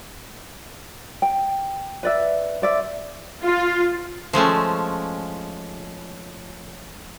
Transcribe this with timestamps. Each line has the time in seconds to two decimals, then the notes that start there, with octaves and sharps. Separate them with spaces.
1.22 G5
2.03 B4 D5 E5
2.62 C5 D5 E5
3.42 F4
4.33 F3 G#3 A3 C#4